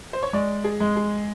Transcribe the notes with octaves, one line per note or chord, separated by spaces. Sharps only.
C5
C#5
G#3 D5
G#4
G#3
G#4